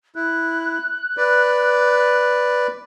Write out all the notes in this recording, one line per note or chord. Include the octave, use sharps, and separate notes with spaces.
E4 F#6
B4 D5